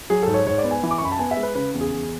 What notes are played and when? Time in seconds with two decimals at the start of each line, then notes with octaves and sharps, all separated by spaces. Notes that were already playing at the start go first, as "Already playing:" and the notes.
0.10 F#3 G#4
0.23 G#2 A4
0.34 C#5
0.46 G#2 C#5
0.58 D5
0.64 B3
0.71 G#5
0.83 E3
0.91 D6
0.98 C#6
1.01 F#2 B5
1.11 A5
1.19 B3 G#5
1.31 E5
1.37 G#3
1.43 B4
1.55 C#3 B4
1.74 E2
1.81 G#4
1.92 E2